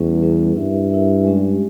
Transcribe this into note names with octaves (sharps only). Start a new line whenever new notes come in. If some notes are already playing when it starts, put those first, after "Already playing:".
Already playing: E2 G3 C#4 G#4 B4
G3 C#4 G#4 B4
G2 E4 A#4 E5
E4 A#4 E5
G#3 C#4 G4